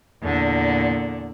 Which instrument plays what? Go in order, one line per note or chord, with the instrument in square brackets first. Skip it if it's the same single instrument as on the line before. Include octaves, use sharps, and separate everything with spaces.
[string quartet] E2 A#2 D3